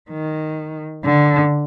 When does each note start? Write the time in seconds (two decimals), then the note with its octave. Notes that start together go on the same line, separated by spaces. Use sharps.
0.11 D#3
1.05 D3